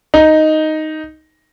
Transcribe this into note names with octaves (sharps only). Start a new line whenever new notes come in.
D#4